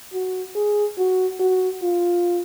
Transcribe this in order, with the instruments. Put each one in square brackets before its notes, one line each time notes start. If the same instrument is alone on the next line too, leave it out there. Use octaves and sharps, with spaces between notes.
[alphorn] F#4
G#4
F#4
F#4
F4